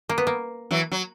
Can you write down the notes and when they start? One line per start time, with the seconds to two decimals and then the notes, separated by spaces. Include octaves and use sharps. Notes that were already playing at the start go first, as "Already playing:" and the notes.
0.09 A#3
0.18 B3
0.27 A#3
0.71 E3 F#3
0.92 F#3